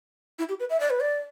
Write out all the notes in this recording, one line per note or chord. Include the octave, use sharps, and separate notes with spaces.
E4
G4
B4
E5
D5
B4
D5